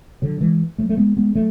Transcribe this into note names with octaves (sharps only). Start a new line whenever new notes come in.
D3 F#3
E3 G#3
F#3 A3
A3
G#3 B3
G#3 B3
F#3 A3